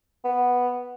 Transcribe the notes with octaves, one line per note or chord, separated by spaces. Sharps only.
B3